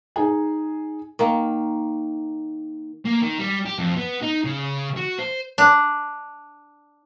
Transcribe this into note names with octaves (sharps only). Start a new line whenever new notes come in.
D#4 G#4 G#5
D#3 A#3
A#3
D#3
G3
G4
F2
B3
D#4
C#3
F#4
C5
D4